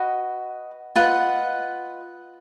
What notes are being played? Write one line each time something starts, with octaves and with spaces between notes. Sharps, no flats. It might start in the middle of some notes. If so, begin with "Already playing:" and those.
Already playing: F#4 B4 D#5
F4 B4 D#5 F#5